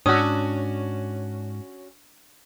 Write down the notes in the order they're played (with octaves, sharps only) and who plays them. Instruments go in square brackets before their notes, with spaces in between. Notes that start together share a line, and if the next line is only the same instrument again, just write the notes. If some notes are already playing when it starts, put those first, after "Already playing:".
[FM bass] G#2 [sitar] C#4 F#4 [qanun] D4 [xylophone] D#6 E6